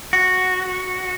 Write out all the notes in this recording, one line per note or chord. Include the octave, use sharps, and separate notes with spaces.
F#4